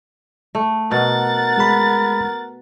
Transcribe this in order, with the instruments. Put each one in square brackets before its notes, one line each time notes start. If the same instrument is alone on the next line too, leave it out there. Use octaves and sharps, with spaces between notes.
[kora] A3
[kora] B2 [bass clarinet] A#4 [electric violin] F#5 A6
[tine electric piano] G#3 G#4 B5